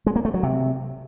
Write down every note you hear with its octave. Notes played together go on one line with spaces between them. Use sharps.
G#3
A#3
A3
F#3
C3